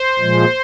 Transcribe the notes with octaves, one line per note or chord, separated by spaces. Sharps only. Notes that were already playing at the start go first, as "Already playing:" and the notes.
Already playing: C5
A#2 F3 G#3